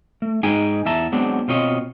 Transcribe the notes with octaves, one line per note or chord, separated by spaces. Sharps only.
A3
G#2 G#3 D#4 G#4 G5 G#5
E2 E5 A5 A#5
F#3 G#3 B3 C4 D4
B2 C4 F4 C#5 D#5